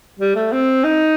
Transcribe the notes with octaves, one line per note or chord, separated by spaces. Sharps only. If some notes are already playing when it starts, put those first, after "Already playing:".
G3
A3
C4
D#4